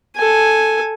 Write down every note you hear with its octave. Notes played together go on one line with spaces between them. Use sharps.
A4 G#5